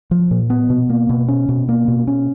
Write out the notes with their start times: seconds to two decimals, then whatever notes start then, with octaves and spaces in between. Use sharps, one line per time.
0.11 F3
0.31 A#2
0.50 B3
0.70 B2
0.90 A#3
1.09 B2
1.28 C#4
1.49 B2
1.69 A#3
1.88 B2
2.07 C#4